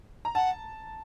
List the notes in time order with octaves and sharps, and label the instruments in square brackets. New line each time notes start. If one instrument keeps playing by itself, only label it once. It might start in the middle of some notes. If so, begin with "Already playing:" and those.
[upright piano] A#5
[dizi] F#5 [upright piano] A5